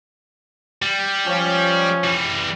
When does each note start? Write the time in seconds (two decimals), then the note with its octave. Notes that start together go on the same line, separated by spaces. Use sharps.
0.82 G3
1.26 F3 C#4
2.04 E3 G3